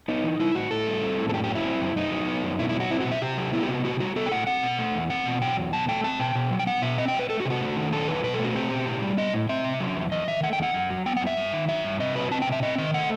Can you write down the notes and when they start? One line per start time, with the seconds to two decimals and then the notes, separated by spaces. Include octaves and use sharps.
0.08 B3 D#4
0.24 E3
0.40 G3 E4
0.55 A2 F#4
0.71 A2 A4
0.87 G3
1.02 C4
1.18 A2
1.29 A4
1.34 F#2 G4
1.44 G4
1.49 F#3
1.55 E4
1.65 C4
1.81 F#2
1.96 F#2 D#4
2.12 F#3
2.27 B3
2.43 F#2
2.59 B2 E4
2.69 E4
2.75 F#3
2.80 F#4
2.91 C4 E4
3.01 F#4
3.06 B2
3.11 E5
3.22 C3 G4
3.37 F#3
3.53 B3 E4
3.63 G4
3.69 C3 F#4
3.84 A2 F#4
4.00 G3 F#4
4.16 B3 A4
4.26 G5
4.32 A2 F#5
4.47 C4 F#5
4.63 B2
4.79 A3
4.95 E2
5.10 C4 F#5
5.26 B2
5.41 F#3 G5
5.57 E2
5.73 B2 A5
5.89 A3 G5
6.04 C4 A5
6.20 B2 G5
6.35 B2
6.51 F#3
6.59 G5
6.67 B3 F#5
6.82 B2 E5
6.98 C4 D#5
7.08 G5
7.14 F#3
7.19 B4
7.30 A3 A4
7.40 F#4
7.45 C3 G4
7.50 F#4
7.61 A3
7.77 D#3
7.92 F#3 A4
8.08 E2 B4
8.23 B2 B4
8.34 A4
8.39 A3
8.44 F#4
8.55 C4 G4
8.71 B2
8.87 A2
9.02 G3
9.17 B3 D#5
9.34 A2
9.49 C4 E5
9.64 C3
9.80 F#3
9.96 E2
10.12 E2 D#5
10.28 D#3 E5
10.43 A3 F#5
10.53 G5
10.59 E2 F#5
10.74 F#2
10.90 F#3
11.06 B3 G5
11.17 F#5
11.21 F#2
11.27 E5
11.37 G2
11.53 D#3
11.68 F#3 E5
11.84 G2
12.00 C3 D#5
12.15 F#3 B4
12.31 C4 A5
12.42 G5
12.47 C3
12.52 E5
12.63 C4 D#5
12.78 D#3 D#5
12.94 A3 F#5